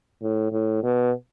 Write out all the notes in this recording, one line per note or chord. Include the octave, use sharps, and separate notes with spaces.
A2
A2
B2